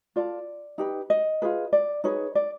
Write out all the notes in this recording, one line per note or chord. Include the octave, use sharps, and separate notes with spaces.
F4 A4 D5
D#4 G4 B4
D#5
F4 G#4 B4
D5
D#4 G#4 B4 C#5
D5